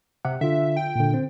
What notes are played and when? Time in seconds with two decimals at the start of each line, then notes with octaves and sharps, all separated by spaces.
0.25 C3 F#5
0.41 D3 F4 E5
0.77 G5
0.95 A#2 D3
1.14 C4